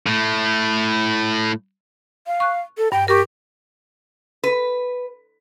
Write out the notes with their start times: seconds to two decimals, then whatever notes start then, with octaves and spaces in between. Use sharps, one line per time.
0.06 A2 A3
2.27 F5
2.40 C#6 F#6
2.78 A4
2.92 G2 G5
3.08 G4 A#4 C#6
4.44 B4